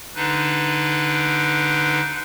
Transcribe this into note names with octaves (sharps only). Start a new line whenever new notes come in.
D3 D4 D#4 B4